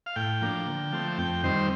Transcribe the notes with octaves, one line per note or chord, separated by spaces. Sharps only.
F5
A2 G5
F3 A#3 D4
D3
F3 A3 C4
F2 G5
D#3 G3 C4 C5